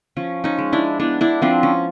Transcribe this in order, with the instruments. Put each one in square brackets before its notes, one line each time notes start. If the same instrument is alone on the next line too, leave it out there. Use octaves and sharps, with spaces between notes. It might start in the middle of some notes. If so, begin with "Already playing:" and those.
[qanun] F3 C#4
C#4 D#4
G#3
D4 E4
B3 D4 E4
D4 E4
F3 C4 D4
C#4